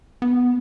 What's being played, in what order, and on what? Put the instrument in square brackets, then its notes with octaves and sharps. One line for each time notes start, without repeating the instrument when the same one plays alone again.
[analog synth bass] B3